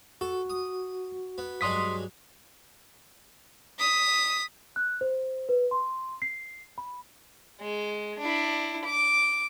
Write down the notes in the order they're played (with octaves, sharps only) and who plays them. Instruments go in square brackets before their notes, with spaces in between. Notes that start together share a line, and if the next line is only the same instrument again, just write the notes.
[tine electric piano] F#4 [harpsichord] A4
[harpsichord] D#6
B3
[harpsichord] G2 F#3 G#3 [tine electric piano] C6 D#6 B6
[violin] D#6 B6
[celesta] F#6
C5
B4
C6
C7
B5
[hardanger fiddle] G#3
D4 E4
D6